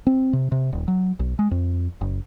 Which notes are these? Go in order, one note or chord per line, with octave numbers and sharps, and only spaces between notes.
C4
C3
C3
D#1
F#3
B1
G#3
F2
F#1